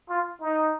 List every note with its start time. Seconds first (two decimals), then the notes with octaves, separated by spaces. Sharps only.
0.09 F4
0.41 D#4